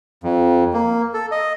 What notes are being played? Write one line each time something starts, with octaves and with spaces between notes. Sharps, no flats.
F2
A#3
A4
D#5